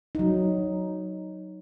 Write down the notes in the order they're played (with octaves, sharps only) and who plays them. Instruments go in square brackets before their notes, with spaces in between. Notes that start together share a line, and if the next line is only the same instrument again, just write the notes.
[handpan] F#3 D#4